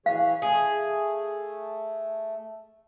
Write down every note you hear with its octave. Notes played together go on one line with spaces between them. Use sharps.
E3 G#4 C#5 F5
A3 G#4